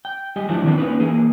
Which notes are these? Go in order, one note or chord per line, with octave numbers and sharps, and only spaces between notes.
G5
G3 G4 D#5 G#5
F3 G3 A3 D4 E4 F#4
D#3 E3 B3 C4 D4 A4
A#3 C#4 D#4 B4
E3 A#3 G#4